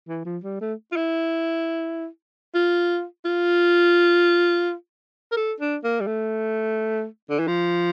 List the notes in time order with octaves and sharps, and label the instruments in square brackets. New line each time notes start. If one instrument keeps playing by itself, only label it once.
[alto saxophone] E3
F3
G3
A3
F4
E4
F4
F4
A#4
A4
D4
A#3
G3
A3
D3
E3
F3